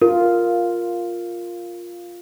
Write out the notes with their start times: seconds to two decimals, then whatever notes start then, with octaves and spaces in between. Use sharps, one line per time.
0.02 F4 A#4